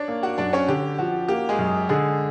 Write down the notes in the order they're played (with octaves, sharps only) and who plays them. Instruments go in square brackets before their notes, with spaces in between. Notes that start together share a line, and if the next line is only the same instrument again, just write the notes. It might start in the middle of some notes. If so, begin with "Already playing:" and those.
Already playing: [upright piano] D4 C#5 D5
[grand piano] A#3
[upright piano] F#4 F#5
[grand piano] F#2 [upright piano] D4 D5
[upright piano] C#4 C#5
[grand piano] D3 [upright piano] G4
[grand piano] F3 [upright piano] F#4
[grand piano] A#3 [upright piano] G4
[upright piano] G#3 G#4
[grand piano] F#2
[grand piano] D3 [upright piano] G#3 G#4